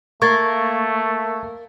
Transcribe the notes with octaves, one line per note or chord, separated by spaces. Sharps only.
A3 A#3 C#6 G#6 A6